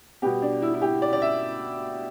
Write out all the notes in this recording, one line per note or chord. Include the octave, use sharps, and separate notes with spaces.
B2 G3 B3 G4
D4
E4
E4
G4
D5
D5
E5